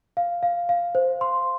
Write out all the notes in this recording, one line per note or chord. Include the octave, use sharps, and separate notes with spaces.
F5
F5
F5
C5
C6